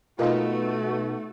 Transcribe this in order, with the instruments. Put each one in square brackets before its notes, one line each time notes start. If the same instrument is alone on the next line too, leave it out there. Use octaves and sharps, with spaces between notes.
[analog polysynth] B2 [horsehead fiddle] A3 F#4 [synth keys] D#4 B4 [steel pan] F4 A#4 D#5